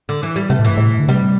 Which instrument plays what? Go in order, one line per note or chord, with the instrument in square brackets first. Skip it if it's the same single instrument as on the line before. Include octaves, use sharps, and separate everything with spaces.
[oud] D3
E3
G3
[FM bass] C3 [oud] A3
[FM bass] A2
[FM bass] G2 [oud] E3
[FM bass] A2
D3
[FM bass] C3 [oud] G3